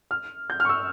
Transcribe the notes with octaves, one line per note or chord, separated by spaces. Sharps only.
F6
G6
F6
C#6
E6